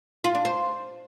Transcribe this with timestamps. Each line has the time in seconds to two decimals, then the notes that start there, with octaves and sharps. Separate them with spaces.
0.24 F4
0.35 D4
0.45 C5